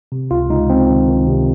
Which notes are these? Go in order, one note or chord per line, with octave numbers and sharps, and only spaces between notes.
C3
C#2 F4
C#2 D#4
C#2 C4
D#3
D#3
C3